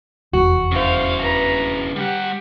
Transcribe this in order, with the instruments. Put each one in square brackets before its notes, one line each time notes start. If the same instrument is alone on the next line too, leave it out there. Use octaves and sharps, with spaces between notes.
[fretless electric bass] F1 E2 [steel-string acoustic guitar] F#4
[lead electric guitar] C#3 E4 [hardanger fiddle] C5 F5
[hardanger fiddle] B4 A#5
[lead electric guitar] G3 F#5 [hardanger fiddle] G4